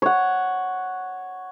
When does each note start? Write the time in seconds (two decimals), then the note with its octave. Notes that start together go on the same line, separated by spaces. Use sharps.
0.02 C#5 F#5